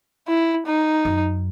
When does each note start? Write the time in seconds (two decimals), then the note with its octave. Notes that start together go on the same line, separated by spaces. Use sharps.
0.28 E4
0.66 D#4
1.05 F#2